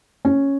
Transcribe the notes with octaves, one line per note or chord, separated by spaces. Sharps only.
C#4